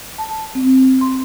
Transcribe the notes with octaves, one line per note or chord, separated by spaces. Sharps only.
A5
C4
C6